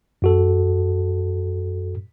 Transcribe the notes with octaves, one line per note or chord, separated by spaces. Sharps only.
F#2 F#4 A4